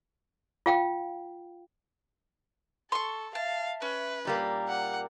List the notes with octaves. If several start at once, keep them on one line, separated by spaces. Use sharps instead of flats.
F4 F5 G5
A4 C6 C#6
E5 F5 A5
C#4 B4
A#2 G3 A#3 A#5
F#5